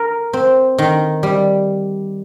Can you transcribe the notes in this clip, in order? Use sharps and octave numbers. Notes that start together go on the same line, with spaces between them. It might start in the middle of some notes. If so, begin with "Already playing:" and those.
Already playing: A#4
C4
D#3
G3